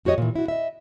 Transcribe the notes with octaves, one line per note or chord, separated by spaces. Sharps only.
F2 F#4 G4 C#5 D#5
A#2 E3
E4 F#4
D#5 E5